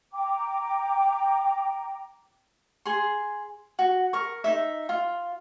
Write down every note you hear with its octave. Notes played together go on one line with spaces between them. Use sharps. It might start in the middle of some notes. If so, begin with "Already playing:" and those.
G5 A#5 D6
G#4 C6
F#4
A#4 C#6
D#4 E5
F4